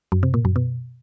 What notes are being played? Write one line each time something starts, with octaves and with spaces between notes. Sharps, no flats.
F#2
C3
A#2
F#2
B2